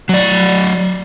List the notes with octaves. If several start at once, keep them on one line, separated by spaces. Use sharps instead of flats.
F#3 D5